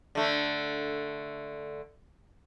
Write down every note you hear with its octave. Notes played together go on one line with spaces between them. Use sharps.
D3 A3